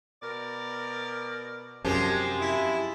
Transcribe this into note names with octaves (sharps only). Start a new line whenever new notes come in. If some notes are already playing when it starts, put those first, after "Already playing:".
B2 A#4 D5
F#2 C3 F3 G#3 G4
E4